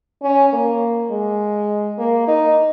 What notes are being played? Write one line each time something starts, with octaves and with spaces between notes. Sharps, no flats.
C#4
A#3
G#3
A#3
D#4